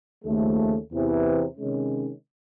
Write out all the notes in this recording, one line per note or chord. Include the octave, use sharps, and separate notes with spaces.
D#2 C#3 F3 A3
E2 C3 E3
C3 D#3 G#3 C#4